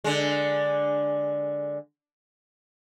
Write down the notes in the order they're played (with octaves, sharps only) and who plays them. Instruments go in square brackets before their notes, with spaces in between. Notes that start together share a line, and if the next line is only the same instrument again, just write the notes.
[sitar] D3 G#3